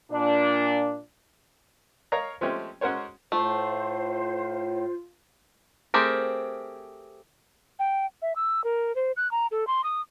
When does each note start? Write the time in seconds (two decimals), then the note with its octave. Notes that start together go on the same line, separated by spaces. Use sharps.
0.12 A#2 D4
2.12 A#4 C#5 D#5 F5 A#5
2.41 F3 G#3 A3 C4 C#4 G4
2.81 G#3 C#4 F#4 A#4 C5 C#5
3.32 A2 A3 F4 C5
5.94 A3 C4 G4 G#4 A#4
7.79 G5
8.22 E5
8.36 E6
8.64 A#4
8.95 C5
9.17 F#6
9.31 A#5
9.51 A4
9.67 C6
9.84 D#6